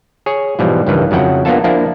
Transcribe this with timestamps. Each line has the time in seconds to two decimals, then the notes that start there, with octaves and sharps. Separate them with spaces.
0.26 G#4 C#5
0.59 G#2 B2 E3 F3 G3
0.87 C#2 G2 D#3 E3 B4
1.11 F2 C#3 F#3 E4 F#5 G5
1.45 A#3 B3 D4 F4 A4 A5
1.64 F3 A#3 D4 E4 F4